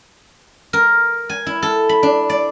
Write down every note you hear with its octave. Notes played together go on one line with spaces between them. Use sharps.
A#4
G#5
E4
A4
B5
D4
D5